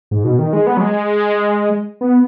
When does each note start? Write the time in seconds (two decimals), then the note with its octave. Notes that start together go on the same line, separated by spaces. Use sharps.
0.11 G#2
0.24 B2
0.39 D#3
0.53 G#3
0.67 B3
0.77 F#3
0.81 G#3
2.01 B3